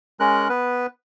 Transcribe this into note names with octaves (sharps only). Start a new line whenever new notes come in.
G#3 C#4 A#4 F#6
B3 B4